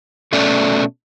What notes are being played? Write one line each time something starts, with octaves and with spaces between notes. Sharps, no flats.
B2 A3 C#4 D5